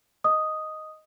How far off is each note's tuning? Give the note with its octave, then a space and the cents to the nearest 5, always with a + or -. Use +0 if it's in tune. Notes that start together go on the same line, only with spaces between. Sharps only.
D#5 +0 D#6 +0